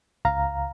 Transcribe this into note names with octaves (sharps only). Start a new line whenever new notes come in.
C#2 F5 A#5